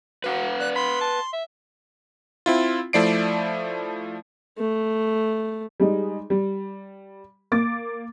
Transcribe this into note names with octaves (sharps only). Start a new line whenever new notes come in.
F#4 B4 F5 F#5
D5 F#6
B5 C6
A5
E5
C4 E4 F4
F3 A3 E4 D5 C7 D7
A3
G3 G#3 D#4
G3
A#3 D6 A6